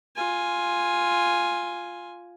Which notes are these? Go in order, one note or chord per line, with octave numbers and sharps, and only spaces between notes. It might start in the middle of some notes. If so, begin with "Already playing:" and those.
F4 G#5